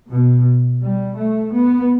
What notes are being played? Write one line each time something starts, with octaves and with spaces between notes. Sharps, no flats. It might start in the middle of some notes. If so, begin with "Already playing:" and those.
B2
G3
A3
B3